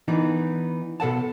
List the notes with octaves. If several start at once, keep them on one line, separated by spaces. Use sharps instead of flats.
E3 B3 D4 D#4
B2 A4 F#5 A5